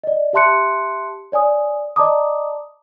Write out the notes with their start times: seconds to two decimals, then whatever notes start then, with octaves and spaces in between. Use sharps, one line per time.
0.04 D5 D#5
0.33 G4 E5 A5 C6 F#6 C#7
1.32 C#5 D5 G#5 D#6
1.96 D5 D#5 A5 A#5 D6 D#6